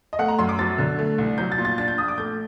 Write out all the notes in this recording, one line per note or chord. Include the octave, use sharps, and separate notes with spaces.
D#5
A3 F#5
A#5
F#2 C6
D6
F#3 A6
D3
A3
C2
F#3 G6
A6
A#2
A6
D4 A6
G6
A#1 D#6
D6
A3 G6